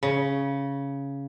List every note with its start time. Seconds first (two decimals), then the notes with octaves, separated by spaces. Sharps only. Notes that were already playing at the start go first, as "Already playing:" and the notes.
0.03 C#3